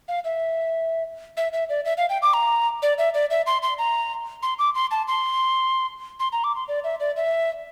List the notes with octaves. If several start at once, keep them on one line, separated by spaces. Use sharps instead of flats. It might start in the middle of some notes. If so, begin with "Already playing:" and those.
F5
E5
E5
E5
D5
E5
F5
G5
D6
A#5
D5
E5
D5
E5
C6
C6
A#5
C6
D6
C6
A5
C6
C6
A#5
D6
C6
D5
E5
D5
E5